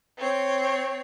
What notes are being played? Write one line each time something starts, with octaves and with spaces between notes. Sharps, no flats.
C4 C#5